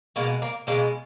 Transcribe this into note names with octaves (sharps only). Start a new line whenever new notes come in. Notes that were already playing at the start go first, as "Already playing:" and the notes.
B2 G#3 A#3
A#3
B2 G#3 A#3